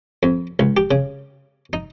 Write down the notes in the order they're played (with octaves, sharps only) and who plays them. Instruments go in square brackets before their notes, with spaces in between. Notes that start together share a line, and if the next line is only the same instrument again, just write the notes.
[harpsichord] F2
C#2
G4
C#3
D#4